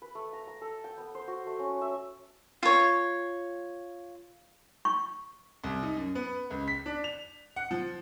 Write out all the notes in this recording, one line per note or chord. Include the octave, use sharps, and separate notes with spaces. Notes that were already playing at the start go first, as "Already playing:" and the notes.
B4
A3
A#5
A#5
A4
G5
B3
C5
F#4
A3
C#4
E5
F4 C#5
C#6
C2
D#4
F#2
B3
C#2
B6
D4
F7
F#5
F3